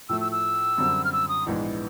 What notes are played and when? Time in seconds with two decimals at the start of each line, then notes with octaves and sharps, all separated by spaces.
0.09 A2 F3 A3 E6
0.21 E6
0.32 E6
0.78 F#2 D3 G3 C4
1.05 F6
1.13 E6
1.29 D#6
1.47 A#1 G#2 E3 G#3 B3